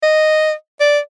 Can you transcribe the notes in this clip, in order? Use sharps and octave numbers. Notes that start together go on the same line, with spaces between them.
D#5
D5